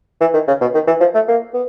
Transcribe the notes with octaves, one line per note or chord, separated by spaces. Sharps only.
E3
D#3
C#3
B2
D#3
E3
F3
A3
A#3
B3